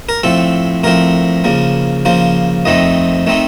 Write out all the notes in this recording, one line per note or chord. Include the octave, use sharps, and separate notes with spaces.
A#4
A2 F3 C4 A4
A2 F3 C4 A#4
C#3 F3 A#3
C#3 F3 A#3 C5
F2 D#3 A3 C4 D#4 D#5
D#3 A3 C4 D#4